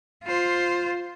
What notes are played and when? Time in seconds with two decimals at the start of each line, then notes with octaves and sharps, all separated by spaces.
0.24 F4 C5